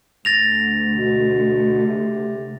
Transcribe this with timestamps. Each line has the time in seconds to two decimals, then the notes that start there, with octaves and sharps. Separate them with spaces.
0.25 D2 A6 A#6 F7
0.95 B2
1.87 C3